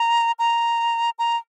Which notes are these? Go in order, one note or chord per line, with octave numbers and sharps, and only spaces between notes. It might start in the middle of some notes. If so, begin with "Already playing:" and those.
Already playing: A#5
A#5
A#5